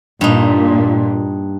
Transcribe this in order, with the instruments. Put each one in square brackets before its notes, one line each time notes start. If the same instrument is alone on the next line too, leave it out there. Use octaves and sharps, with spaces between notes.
[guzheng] G2 D#4 [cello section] A#2